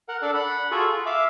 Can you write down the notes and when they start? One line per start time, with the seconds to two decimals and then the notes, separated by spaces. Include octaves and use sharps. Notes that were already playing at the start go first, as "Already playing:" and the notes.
0.09 A#4 F#5
0.22 D4 A4 D5
0.34 F#5 B5
0.71 F4 F#4 G#4 A4
0.89 F4
1.06 E5 F5 D6